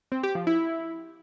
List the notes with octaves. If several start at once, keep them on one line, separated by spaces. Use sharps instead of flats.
C4
G4
F3
E4